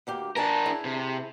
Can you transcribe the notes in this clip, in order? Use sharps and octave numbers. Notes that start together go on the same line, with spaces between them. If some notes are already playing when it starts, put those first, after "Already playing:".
D2 A#3 G4
D4 A#4 G#5 A5
E4 G#4
C3